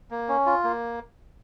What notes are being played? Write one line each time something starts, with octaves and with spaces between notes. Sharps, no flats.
A#3
C#4
F4
A#3